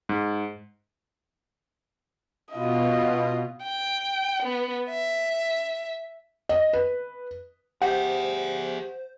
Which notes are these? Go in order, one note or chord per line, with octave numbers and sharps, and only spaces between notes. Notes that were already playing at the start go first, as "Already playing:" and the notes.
G#2
B2 F4 D#5
G5
B3
E5
D#5
B4
G4 G#4 C5 E5 F#5